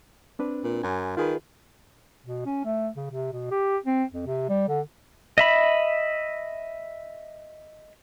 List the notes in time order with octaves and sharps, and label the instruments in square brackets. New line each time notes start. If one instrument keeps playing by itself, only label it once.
[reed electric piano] C4 D4 B4
[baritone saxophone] A#2
[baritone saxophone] F#2 [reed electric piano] G#5
[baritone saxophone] D#3 [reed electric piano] F4 G#4 B4
[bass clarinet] B2
C#4
A3
C#3
C3
B2
G4
C4
F2
C3
G3
D3
[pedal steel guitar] D#5 E5 B5